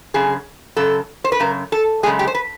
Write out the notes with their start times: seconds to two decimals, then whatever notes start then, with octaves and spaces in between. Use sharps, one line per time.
0.14 F#2 C#3 G#4
0.76 F#2 C#3 A4
1.24 C5
1.32 B4
1.40 F#2 C#3 A#4
1.72 A4
2.03 F#2 C#3 E3 G#3 G#4
2.19 G4
2.27 C5
2.35 B4